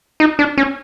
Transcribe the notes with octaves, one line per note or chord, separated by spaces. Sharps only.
D#4
D4
C#4